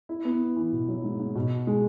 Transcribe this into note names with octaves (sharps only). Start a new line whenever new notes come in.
E4
B3
E3
B2
F#3
G#2
G#2
B2
G#3